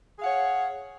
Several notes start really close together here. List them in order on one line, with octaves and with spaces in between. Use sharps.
G#4 F5 F#5 C#5